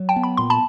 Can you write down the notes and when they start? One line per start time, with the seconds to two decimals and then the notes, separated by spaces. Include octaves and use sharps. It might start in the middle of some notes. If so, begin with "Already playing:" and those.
Already playing: F#3
0.09 G5 A5
0.16 B3
0.23 B5
0.37 A#2 C6
0.50 A5 B5